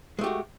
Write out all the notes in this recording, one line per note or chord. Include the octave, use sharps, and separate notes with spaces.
G#3 A3 F#4 G4